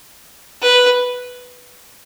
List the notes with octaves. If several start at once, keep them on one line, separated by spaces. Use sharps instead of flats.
B4